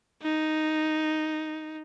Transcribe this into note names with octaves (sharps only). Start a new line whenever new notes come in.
D#4